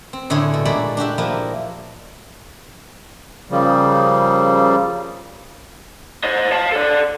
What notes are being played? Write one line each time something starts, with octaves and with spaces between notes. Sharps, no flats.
C4
A2 D3 E4 G#4 C#5 C6
B2
A#2 G#3 F#4 A4 D5 B5
D4 F#4 G4 E5
F3 A#3 E4
C#3 F3 G3 A#3
C5 D#5
F5 A5
A4 D5